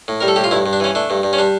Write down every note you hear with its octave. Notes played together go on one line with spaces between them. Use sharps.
A2
G3 A#4
A4
A2 G4
F4
G2 E4
G2
D4
E3 C#4
A3 D4
G2
G2
C#4
G3 D4